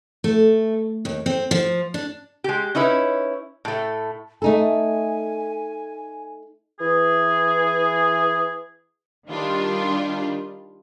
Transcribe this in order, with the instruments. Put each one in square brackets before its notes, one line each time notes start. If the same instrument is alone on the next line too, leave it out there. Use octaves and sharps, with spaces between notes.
[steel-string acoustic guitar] A3
D#2
C4
F3
D4
[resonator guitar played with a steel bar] G#3 G4
C#4 D#4 E4 B4 C#5
A2 A3
[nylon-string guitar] A3 D#4 A4 [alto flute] G#5
[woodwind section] E3 G#4
[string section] D#3 G3 D4 F4